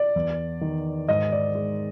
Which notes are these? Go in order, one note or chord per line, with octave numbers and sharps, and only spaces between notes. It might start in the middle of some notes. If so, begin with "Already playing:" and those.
Already playing: D5
E2
D#3
G#2 D#5
D5
G#3